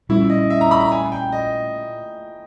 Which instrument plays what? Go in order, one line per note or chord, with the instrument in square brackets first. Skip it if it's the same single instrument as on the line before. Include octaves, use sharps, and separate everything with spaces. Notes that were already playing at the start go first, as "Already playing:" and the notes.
[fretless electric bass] A#2 G3 C#4 [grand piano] E4
[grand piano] D#5
E5
A#5
B5
A#5
G#5
G5
D#5